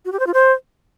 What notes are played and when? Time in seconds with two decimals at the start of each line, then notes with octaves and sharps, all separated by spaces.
0.05 F#4
0.12 G4
0.20 C5
0.27 F4
0.34 C5